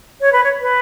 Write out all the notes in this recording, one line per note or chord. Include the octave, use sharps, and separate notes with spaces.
C#5
B4
C#5
B4